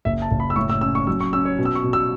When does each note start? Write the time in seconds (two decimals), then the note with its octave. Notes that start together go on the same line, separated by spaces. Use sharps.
0.05 F#1 E5
0.22 A5
0.31 F#1
0.40 B5
0.50 E6
0.56 A2 C#6
0.70 E6
0.81 C#4 E6
0.95 C#6
1.07 F#3 E6
1.20 C#6
1.33 C#4 E6
1.45 C#5
1.59 B2
1.65 E6
1.75 C#6
1.84 B2
1.93 E6